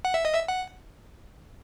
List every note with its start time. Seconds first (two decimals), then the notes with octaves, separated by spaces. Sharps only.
0.05 F#5
0.14 E5
0.25 D#5
0.34 E5
0.48 F#5